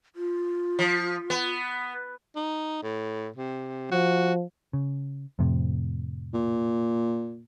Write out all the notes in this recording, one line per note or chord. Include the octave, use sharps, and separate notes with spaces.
F4
F3
B3
D#4
A2
C3
F3 F#4
C#3
F2 A2 C3
A#2